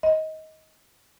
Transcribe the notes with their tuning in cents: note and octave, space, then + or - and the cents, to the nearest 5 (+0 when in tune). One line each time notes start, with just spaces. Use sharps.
D#5 +20